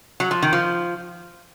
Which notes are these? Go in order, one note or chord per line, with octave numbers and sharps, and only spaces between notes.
F#3
F3
D#3
F3